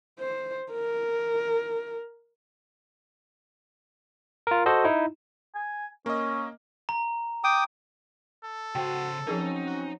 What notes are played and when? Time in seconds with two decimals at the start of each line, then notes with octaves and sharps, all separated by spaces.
0.19 C5
0.72 A#4
4.47 F4 A#4
4.66 F#4 A4 C5 D#5
4.84 D#4 E4
5.55 G#5
6.06 A#3 C#4 D#5
6.89 A#5
7.44 G5 D6 D#6
8.44 A4
8.75 C#3 F#4 C5 G5
9.27 F3 F#3 C4 C#4 D#4 G#4 A#4
9.66 F#4